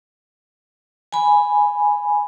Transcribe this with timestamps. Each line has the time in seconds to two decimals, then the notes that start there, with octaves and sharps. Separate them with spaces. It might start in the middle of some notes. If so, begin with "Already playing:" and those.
1.13 G#5 B5